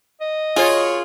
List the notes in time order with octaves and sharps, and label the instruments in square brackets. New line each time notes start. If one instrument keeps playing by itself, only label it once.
[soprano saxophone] D#5
[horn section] F#2 C#5 [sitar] F4 [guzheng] G#4